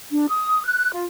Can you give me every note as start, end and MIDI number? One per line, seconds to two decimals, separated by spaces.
0.11 0.26 62
0.31 0.64 87
0.65 0.92 90
0.92 1.06 65